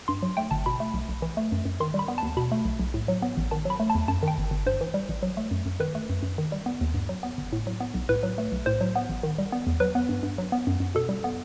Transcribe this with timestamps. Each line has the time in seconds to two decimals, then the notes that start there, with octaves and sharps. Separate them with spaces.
0.08 G2 C6
0.23 F#3
0.37 A3 G5
0.51 G1 A5
0.66 B2 B5
0.80 A3
0.94 B1
1.09 B1
1.22 E3
1.37 A3
1.52 F#2
1.65 F#2
1.80 D#3 C6
1.94 G3
1.99 B5
2.08 B3
2.18 A5
2.23 D#2
2.37 B2 B5
2.52 A3
2.65 B1
2.80 B1
2.94 A2
3.08 F#3
3.22 B3
3.37 A1
3.51 D#3 A5
3.65 F#3 B5
3.80 A3
3.90 A5
3.95 E2
4.08 F#2 A5
4.23 D#3 G5
4.38 G1
4.51 G1
4.66 G2 C5
4.81 E3
4.94 G3
5.09 A1
5.23 F#3
5.37 A3
5.51 F#2
5.66 F#2
5.80 D#3 B4
5.95 A3
6.10 F#2
6.23 F#2
6.38 D#3
6.52 G3
6.66 B3
6.81 D#2
6.94 G2
7.09 F#3
7.23 B3
7.38 G1
7.53 A2
7.67 F#3
7.80 B3
7.94 B1
8.09 A2 B4
8.23 F#3
8.38 A3
8.52 B1
8.66 A2 C5
8.81 F#3
8.96 B3
9.09 A1
9.23 D#3
9.38 G3
9.52 B3
9.67 E2
9.80 F#3 B4
9.95 B3
10.09 G2
10.23 G2
10.38 F#3
10.52 B3
10.67 F#2
10.80 F#2
10.95 B2 A4
11.09 G3
11.24 B3